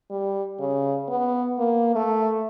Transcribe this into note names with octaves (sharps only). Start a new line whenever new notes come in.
G3
C#3
B3
A#3
A3